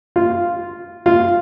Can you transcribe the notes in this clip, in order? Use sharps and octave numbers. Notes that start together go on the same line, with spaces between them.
F4
F4